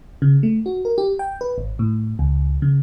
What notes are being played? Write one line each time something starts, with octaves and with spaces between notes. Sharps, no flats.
C#3
A3
F#4
A#4
G4
G5
B4
G#1
A2
C#2
C#3